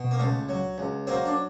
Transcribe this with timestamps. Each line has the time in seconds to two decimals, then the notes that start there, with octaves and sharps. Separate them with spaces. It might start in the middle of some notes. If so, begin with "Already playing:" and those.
Already playing: B2
0.11 A#3
0.19 C#2 A3
0.49 F#3
0.78 C#2
1.07 F#3 A#3 C4
1.25 D4